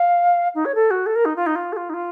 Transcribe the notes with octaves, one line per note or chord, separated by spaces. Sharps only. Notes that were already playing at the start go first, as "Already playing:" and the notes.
Already playing: F5
D#4
C#5
A4
F#4
A4
A#4
D#4
F4
D#4
F4
A4
F4
D#4
F4